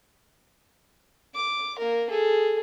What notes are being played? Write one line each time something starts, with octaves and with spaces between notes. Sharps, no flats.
D6
A#3 A#4
G#4 A4